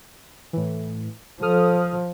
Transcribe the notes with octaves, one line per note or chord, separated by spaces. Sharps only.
A2 E3
F3 A4 D#6 F6